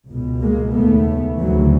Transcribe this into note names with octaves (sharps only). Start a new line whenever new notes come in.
C#2 B2
G#3 A#3
D#2 C#3 A3 B3
D2 C#3 E3 F#3